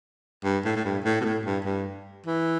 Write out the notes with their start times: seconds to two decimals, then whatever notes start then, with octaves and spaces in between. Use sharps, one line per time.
0.44 G2
0.65 A2
0.76 A2
0.85 G2
1.05 A2
1.21 B2
1.25 A2
1.45 G2
1.65 G2
2.26 E3